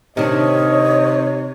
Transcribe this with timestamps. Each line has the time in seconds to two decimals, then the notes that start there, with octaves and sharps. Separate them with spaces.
0.17 C3 D#3 D4 C#5 D#5